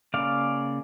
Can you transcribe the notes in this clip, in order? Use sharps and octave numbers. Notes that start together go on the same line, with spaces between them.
C#3 A#3 D5 F5